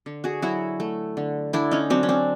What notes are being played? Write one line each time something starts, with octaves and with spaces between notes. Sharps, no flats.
D3
F#4 G#4
F#3 E4 F#4
A3
D3
D3 D4 E4
C#4 D#4
F#3 C4 D4
C#4
C4 D4